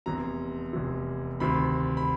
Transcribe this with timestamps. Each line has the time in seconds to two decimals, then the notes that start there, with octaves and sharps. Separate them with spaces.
0.06 F1 E2 C3 A#5
0.73 F1 E2 C3
1.40 D2 C3 D#3 B5
1.97 B5